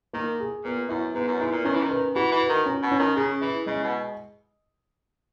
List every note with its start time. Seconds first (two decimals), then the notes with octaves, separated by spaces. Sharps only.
0.13 D#3 A#3
0.40 G#4
0.64 A#2 B3
0.89 F#2 E4
1.15 G#2 B3
1.27 F#2
1.39 G#2 E4
1.52 A#2
1.65 D#3 C#4
1.74 E3
1.83 D#3
1.91 B4
2.15 E3 F#4
2.32 E3
2.41 B4
2.49 D#3
2.66 C#4
2.83 B2
2.91 C#4
2.99 D#3
3.16 C#3 G#4
3.41 E3 E4
3.66 C#3 G#3
3.83 B2